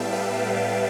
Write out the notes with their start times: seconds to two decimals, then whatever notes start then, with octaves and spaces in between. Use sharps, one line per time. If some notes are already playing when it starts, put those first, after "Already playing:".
Already playing: A2 G3 B3 E5 F5 G5 A5
0.13 G4 B4